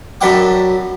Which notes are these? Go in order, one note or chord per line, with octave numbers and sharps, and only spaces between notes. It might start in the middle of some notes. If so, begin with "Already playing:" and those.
F#2 D4 B4 F#5 G5 D6